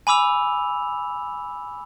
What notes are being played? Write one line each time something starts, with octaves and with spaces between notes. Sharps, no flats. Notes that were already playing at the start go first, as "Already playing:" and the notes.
G#5 B5 D6 E6 F7